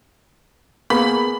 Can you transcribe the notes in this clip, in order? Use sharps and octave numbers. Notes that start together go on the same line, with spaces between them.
A#3 B3 G#4 B5